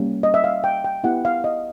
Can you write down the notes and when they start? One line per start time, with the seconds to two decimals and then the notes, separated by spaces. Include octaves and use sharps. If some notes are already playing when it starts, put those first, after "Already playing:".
Already playing: G3 A#3 C#4
0.23 D#5
0.34 E5
0.44 F5
0.64 G5
0.84 G5
1.04 B3 E4 G4 F#5
1.25 F5
1.44 D#5